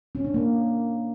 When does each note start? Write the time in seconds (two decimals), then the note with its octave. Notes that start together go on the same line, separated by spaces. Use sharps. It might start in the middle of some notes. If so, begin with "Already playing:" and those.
0.15 C#4
0.25 D4
0.34 A#3